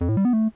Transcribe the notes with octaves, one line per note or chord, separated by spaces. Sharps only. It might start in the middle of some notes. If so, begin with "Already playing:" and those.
F2
A2
G3
B3
A3